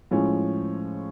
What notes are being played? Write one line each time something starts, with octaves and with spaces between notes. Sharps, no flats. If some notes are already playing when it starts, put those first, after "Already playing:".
A2 F3 G#3 C#4